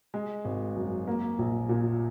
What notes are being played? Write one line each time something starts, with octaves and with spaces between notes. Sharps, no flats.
G#3
G#1
F#2
A#3
A#1
A#2